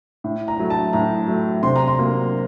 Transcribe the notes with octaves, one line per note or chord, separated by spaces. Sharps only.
A2
A#5
F#3 A3
A5
A2 A#5
F#3 A3
C3 C6
A#5
C6
F#3 A#3